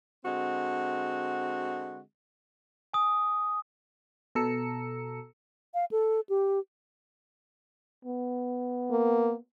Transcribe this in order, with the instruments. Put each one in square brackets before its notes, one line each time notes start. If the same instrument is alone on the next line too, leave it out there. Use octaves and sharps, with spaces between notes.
[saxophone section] D3 G#3 C4 F#4
[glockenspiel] G#5 D#6
[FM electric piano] B2 A4 A#5 E6 C#7
[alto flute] F5
A4
G4
[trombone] B3
[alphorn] A#3